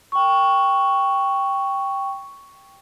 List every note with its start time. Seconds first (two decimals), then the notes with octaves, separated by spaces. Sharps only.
0.12 G5 C#6